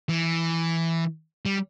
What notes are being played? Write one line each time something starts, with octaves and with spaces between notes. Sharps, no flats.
E3
G3